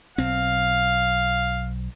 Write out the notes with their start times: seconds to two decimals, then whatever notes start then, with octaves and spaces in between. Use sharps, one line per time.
0.18 B1 C4 F5